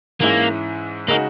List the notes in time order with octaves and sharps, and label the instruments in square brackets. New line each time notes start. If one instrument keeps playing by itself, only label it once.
[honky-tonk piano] G#2 E3 G#3 C#4 E4 [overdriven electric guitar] A#3
[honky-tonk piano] C#3 G#3 D#4 F#4 [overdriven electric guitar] A#3